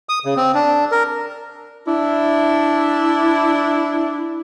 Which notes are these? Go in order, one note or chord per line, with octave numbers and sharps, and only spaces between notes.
D#6
C#3
C4
D4
A#4
D4 E4